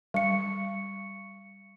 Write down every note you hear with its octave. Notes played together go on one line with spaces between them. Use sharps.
G3 C#6 C#7